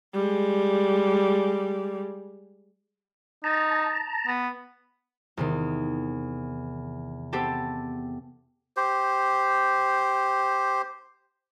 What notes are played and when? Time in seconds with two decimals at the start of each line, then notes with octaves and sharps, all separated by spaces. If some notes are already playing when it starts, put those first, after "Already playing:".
0.14 G3 G#3
3.44 D#4 A5 A#5
4.27 B3
5.37 E2 C3 D#3
7.33 B3 C4 G4 A4
8.77 G4 C5